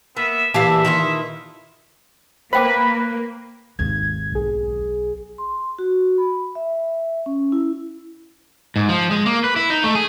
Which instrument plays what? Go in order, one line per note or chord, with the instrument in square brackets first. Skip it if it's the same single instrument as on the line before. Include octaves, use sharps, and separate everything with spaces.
[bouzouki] A#3 [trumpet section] B3 E5
[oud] A#2 E3 F5 [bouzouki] G4 G#4 A5 [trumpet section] E5
[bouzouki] D#3 E4 F4
[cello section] A#3 [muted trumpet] B4 [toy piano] C5 G5 D6 [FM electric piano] B5
[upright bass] G#1 D#2 [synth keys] G#6
[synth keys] B1 G#4
[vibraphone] C6
F#4
B5
E5
C#4
E4
[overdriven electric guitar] G#2
F3
G#3
A#3
B4
E4
D#4
A3
G#4